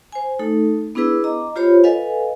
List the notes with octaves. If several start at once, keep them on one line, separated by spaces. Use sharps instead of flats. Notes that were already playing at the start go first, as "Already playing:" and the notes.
C5 G#5
A3 D#4 A4
B3 D4 E4 G#4 B4 E6
D#5 A#5 D6
F4 G4 C5 C#5 B5
A4 B4 D#5 F5 G#5